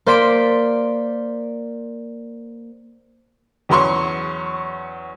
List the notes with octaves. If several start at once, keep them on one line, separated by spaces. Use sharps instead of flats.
A#3 C5 D5 C6 B6 D7
E2 F#3 C#4 C6 C#6